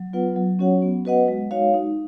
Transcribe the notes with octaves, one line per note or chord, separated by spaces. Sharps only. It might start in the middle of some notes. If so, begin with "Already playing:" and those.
Already playing: F#3
B3 F4 B4 F#5
F#3
C#4 F#4 C#5 F#5
B3
F#4 B4 D#5 F#5
G#3
D#4 F#4 C#5 F5
D#4